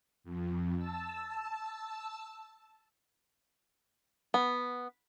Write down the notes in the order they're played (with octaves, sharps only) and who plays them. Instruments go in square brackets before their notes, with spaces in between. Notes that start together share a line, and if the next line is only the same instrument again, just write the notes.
[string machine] F2
A5 E6
[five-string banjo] B3